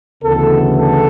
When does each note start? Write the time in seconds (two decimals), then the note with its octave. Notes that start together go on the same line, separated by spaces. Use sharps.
0.22 D2 C#3 E3 B3 A4
0.76 A4